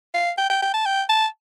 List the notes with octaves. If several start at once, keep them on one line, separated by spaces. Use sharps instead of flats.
F5
G5
G5
G5
A5
G5
A5